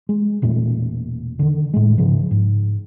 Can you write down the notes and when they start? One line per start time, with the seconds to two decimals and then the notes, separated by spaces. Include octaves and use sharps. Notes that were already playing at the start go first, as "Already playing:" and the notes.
0.09 G#3
0.42 E1 A#2 A3 A#3
1.39 D3 D#3
1.73 A2 G#3
1.98 G#2 C#3 F3
2.31 G#2